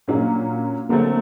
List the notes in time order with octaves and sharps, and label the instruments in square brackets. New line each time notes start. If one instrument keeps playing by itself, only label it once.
[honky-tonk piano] A#2 F#3 A#3 C#4 F4 [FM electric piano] D4
[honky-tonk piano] D3 F#3 A3 C4 [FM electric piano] A#3